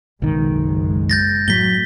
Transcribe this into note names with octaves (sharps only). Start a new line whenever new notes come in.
F#1 B1 D#3 G#3
G6 A6 A#6
A2 F#3 B6 G7